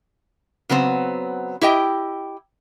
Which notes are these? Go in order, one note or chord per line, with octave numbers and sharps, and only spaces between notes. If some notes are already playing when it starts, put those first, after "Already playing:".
C#3 F#3 B3 C4
E4 G4 D#5 G5